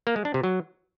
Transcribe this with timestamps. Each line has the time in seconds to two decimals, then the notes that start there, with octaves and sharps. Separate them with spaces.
0.07 A#3
0.16 G#3
0.25 D4
0.34 C3
0.43 F#3